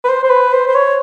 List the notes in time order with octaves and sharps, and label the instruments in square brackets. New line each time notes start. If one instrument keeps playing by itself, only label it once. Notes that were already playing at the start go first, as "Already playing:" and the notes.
[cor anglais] B4
C5
C5
B4
C5
C5
C#5